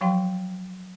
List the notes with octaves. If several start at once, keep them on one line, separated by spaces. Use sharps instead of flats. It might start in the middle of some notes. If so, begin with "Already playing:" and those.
F3 F#3 F5 G5 C6